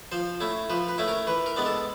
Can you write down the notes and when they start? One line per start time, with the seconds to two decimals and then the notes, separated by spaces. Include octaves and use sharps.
0.12 F3 C5
0.40 A3 C#4 E4
0.70 F3 B4
0.89 B4
0.98 A3 C#4 E4
1.08 A#4
1.27 E3 B4
1.46 A#4
1.56 G#3 B3 D4
1.66 A4